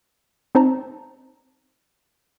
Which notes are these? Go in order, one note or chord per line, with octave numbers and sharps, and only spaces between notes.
C4 D#4 C5 A5 A#5